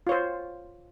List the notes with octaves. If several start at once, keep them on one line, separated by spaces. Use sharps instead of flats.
F4 C5 C#5